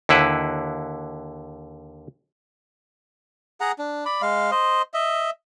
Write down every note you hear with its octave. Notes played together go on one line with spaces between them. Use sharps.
D#2 D3 E4 B4
G#4 F#5 A#5
D4
D5 B5
G#3 F5
C5 D#5
D#5 E5